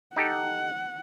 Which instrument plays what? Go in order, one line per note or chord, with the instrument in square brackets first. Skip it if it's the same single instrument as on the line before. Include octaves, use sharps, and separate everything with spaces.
[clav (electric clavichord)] D#4 G4 A4 [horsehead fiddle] F#5